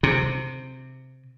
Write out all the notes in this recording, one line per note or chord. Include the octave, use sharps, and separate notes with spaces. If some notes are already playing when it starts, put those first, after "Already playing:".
C3